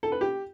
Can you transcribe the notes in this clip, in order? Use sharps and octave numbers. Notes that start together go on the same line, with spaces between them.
A4
B4
G4